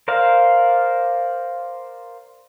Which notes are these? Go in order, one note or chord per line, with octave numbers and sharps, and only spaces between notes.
A#4 C5 D5 F5